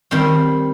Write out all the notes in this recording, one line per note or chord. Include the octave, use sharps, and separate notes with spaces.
D#3 G3 C4